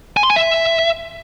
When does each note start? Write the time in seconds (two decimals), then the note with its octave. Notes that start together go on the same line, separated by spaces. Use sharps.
0.17 G#5
0.23 C6
0.30 G#5
0.36 E5